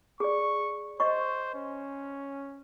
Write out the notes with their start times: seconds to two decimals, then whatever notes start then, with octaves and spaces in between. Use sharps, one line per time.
0.20 G#4 D5 C#6
1.00 C5 D#5 C#6
1.55 C#4